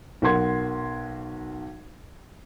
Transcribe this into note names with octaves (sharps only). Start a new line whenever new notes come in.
B1 A#4 F#5 C6 G#6